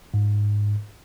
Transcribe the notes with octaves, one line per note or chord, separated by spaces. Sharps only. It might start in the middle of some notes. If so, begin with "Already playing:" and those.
G#2